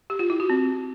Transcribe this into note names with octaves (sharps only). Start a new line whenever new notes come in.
G4
F4
E4
F#4
C4